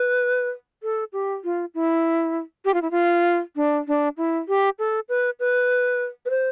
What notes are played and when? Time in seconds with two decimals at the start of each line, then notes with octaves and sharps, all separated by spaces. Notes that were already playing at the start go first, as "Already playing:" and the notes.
Already playing: B4
0.83 A4
1.13 G4
1.44 F4
1.75 E4
2.65 G4
2.74 F4
2.82 E4
2.91 F4
3.56 D4
3.88 D4
4.17 E4
4.48 G4
4.79 A4
5.09 B4
5.40 B4
6.26 B4
6.30 C5